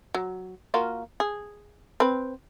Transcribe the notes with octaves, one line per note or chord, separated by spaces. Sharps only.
F#3
A#3 F4 F#4
G#4
C4 B4